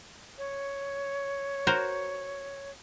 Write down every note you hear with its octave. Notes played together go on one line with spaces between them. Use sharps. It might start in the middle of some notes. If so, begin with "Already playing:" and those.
C#5
F#4 A#4 C5